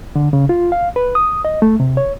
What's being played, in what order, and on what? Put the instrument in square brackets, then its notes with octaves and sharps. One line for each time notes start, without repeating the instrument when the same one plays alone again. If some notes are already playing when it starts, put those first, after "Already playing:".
[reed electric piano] D3
C#3
F4
F5
B4
D#6
D#5
A3
C3
C#5